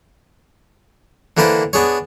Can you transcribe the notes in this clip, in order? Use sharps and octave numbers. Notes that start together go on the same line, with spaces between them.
D3 E3 A#3 D4 B4 C5
B3 D4 G#4 C#5